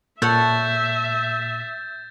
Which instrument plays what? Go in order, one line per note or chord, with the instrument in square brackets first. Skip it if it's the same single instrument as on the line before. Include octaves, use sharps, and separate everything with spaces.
[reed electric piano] A#2 [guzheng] A4 C#5 F#5 [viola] E5 [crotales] G6 A6